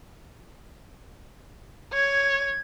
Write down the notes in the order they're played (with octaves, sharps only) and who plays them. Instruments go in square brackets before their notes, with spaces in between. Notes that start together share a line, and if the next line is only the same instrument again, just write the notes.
[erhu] C#5 [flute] G#6